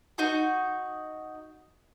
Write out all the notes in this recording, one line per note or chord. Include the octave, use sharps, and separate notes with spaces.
D#4 F#4